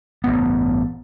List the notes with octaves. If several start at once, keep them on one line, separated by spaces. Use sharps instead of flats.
A1 G2 B3